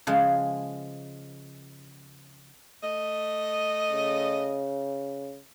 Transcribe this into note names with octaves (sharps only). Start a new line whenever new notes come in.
C#3 F3 G#3
A3 D#5
C#3